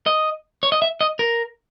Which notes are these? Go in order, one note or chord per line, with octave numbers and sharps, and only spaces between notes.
D#5
C#5
D#5
E5
D#5
A#4